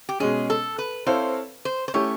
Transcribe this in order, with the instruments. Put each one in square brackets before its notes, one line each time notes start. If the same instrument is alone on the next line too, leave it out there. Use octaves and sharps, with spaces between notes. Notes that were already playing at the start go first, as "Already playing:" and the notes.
[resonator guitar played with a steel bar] G4
[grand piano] B2 G#3 C#4 [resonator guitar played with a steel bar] G#4
[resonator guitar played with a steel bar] A4
B4
[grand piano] C4 E4 A4 C#5 F5 [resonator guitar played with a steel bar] C5
[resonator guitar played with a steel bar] C5
C5
[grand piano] A3 C#4 E4 G4 [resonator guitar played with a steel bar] C#5